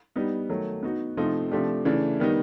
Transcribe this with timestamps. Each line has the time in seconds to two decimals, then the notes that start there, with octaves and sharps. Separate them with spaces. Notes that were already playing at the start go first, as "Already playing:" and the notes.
0.16 G3 B3 D#4
0.49 D#3 F#3 A3
0.83 B3 D#4 F#4
1.17 C3 F3 A3 C4 D#4
1.52 C3 F3 A3 D4 G4
1.85 C#3 E3 A3 D4
2.20 D#3 G3 B3 D#4